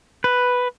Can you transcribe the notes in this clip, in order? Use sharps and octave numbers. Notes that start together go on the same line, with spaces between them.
B4